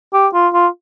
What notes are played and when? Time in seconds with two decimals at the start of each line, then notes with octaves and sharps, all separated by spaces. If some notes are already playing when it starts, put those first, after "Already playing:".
0.13 G4
0.34 F4
0.54 F4